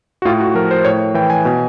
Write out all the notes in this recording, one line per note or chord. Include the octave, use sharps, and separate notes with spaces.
F#4
A2 F4
F#4
F3 A#4
C5
A2 C#5
E3 G5
G#5
B2